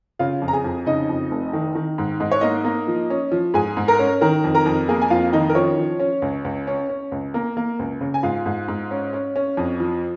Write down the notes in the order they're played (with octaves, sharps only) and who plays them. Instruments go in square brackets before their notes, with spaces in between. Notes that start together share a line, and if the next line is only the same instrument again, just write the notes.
[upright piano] C#3 F4 F5
F2
A#5
G#4 G#5
F2
C#3 D#4 D#5
F2
F1
D#3
D#3
G#2
G#2 D#5
C#5
A#3 D#4 D#5
A#3
F3
C#4
F3
G#2 G#4 G#5
G#2
A#4 A#5
C#4
D#3 A#4 A#5
F2
A#4 A#5
F2
A#3 G#4 G#5
G#5
F2 F4 F5
D#3 D#4 D#5
A#4
F3 C#4 C#5
F3
C#4
C#2
C#2
C#4
C#4
C#2
A#3
A#3
C#2
C#3
G#5
G#2 F4 F5
G#2
G#2
C#4
C#4
C#4
F2
F3